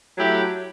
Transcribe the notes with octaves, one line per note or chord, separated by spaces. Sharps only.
F#3 A3 E4 G4